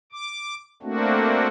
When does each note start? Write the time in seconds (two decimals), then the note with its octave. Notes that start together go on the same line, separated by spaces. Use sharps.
0.12 D6
0.83 A3 A#3 C4 D4 F#4